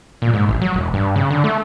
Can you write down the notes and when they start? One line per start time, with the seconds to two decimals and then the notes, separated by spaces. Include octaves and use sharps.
0.22 A#2
0.33 G#2
0.49 A1
0.62 F#3
0.74 E1
0.94 G2
1.16 C#3
1.31 D3
1.44 A3